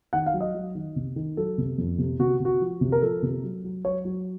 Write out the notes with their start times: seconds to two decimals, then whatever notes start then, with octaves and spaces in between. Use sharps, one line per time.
0.13 D#3 F#5
0.26 F5
0.34 F#3
0.41 D#5
0.54 F#3
0.75 D#3
0.96 C3
1.16 D#3
1.37 F#3 A4
1.58 C3
1.78 F2
1.98 C3
2.19 C3 F#4
2.40 C3 F#4
2.61 F3
2.81 C3
2.92 A#4
3.02 F3 A4
3.23 C3
3.43 F#3
3.64 F#3
3.85 F#3 C#5
4.05 F#3